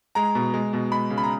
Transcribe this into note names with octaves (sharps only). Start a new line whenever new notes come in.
G#3 A#5
B2
G#3
B2
G#3 B5
C#3
B5
A#5